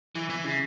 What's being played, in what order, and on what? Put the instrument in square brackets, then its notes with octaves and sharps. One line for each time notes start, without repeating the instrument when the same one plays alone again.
[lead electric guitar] E3
E3
C#3